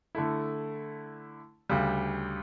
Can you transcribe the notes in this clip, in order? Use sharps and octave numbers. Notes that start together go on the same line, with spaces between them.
D3 A3 E4
D2 C#3 G3